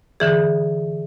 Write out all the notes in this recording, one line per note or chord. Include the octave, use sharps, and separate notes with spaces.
D3 E3 G#4